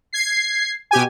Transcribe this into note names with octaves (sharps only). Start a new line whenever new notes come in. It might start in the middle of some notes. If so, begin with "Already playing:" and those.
G#6 C7
B2 G4 G#5